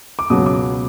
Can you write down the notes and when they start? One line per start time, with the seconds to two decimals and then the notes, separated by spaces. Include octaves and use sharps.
0.19 D6
0.30 C#2 B2 F#3 D#6
0.46 D6